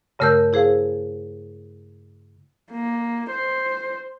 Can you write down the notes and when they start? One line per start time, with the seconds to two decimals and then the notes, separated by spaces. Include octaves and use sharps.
0.19 G2 C#3 A3 A#4 E6 G6
0.53 E4 G#4 C5 F5
2.72 A#3
3.30 C5